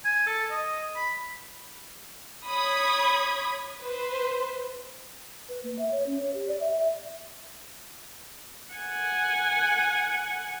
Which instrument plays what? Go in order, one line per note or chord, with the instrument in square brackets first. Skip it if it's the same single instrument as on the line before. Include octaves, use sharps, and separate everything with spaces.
[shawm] G#5
A4
D#5
B5
[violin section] C#5 B5 D#6 G#6
B4 C5
[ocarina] B4
A#3
E5
C#5
C#4
C#5
G4
D5
E5
E5
[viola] F#5 G#5